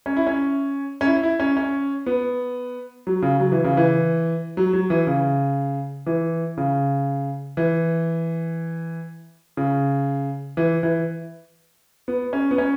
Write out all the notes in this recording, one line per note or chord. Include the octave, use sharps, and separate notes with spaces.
C#4
E4
C#4
C#4
E4
E4
C#4
C#4
B3
F#3
C#3
F#3
E3
C#3
E3
F#3
F#3
E3
C#3
E3
C#3
E3
C#3
E3
E3
B3
C#4
B3
C#4